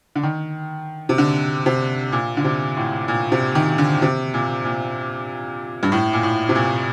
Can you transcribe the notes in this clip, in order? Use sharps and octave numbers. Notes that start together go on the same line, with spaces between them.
D3
D#3
C3
D3
C3
A#2
D3
C3
A2
A#2
C3
D#3
D3
C3
A#2
A#2
G2
A2
A#2
A2
C3
A#2